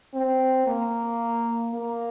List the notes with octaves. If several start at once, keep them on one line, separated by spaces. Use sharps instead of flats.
C4
A#3
A#3